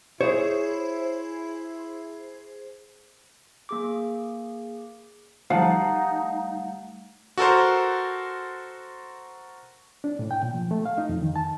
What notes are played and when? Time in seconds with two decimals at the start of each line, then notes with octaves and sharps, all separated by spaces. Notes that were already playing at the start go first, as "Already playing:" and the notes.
0.21 E4 G#4 C5 C#5
3.69 A#3 G#4 D6
5.50 F3 G3 A3 D#4 F5 F#5 A5
7.38 F#4 A4 A#4 C5
10.04 D4
10.19 A2
10.31 G5
10.43 A#2
10.54 F3
10.71 A3
10.86 F5
10.98 D#4
11.09 F2
11.22 D#3
11.36 A5